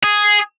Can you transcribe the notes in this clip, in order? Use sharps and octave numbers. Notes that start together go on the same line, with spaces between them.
G#4